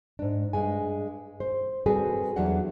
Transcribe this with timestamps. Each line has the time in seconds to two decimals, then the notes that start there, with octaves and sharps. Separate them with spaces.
0.19 G#2 D4
0.53 G2 G#3 G#5
1.40 C5
1.86 G3 C4 F#4 G#4 A4 B4
2.36 E2 F#3 G3 D4 F#5